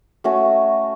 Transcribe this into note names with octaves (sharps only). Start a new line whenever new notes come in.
A3 C#4 F#4